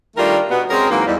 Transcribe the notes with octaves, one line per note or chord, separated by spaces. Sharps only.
D#3 G3 A3 D4 F4 A#4
B2 B3
G#3 C4 C#4 G#4 A#4
G#2 E3 F#3 A#3
E2 G#2 G3